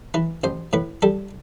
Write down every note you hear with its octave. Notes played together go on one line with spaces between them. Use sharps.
E3 B4
A1 C5
A2 B4
G3 A4